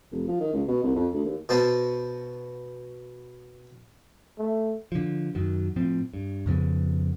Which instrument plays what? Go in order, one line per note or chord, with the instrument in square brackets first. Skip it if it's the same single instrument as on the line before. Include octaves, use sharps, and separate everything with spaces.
[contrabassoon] F1
F3
D#3
C#2
B2
C2
F2
D2
D#2
[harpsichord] B2 B3 C5 A5
[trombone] A3
[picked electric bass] D3 F3
F#2 D#3 F#3
A2 F3 C4
G2
F2 C#3 F3 B3